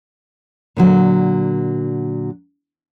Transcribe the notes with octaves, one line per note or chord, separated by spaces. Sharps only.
A#2 D3 F#3